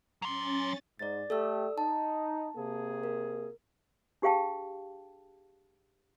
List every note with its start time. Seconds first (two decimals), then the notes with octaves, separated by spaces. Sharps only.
0.22 F#3 C#4 C6 A6
0.99 G#2 D5 A6
1.30 A3 G4 A4 D5 E6
1.78 D#4 A5
2.56 C3 A#3 G#4
3.03 A#4
4.22 D4 G4 G#4 F5 G5 A5